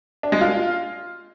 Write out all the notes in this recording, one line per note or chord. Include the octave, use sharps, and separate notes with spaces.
D4
G#3
F4